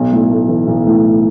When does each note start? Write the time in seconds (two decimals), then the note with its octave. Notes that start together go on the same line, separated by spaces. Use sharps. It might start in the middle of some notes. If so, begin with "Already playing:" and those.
Already playing: B1
0.12 A2
0.30 A3
0.48 E3
0.67 B1
0.86 A2